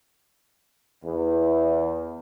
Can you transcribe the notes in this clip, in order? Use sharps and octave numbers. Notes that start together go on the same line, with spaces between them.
E2